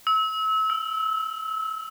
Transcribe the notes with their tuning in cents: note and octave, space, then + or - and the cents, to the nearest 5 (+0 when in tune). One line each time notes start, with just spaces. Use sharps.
E6 -30
E6 +15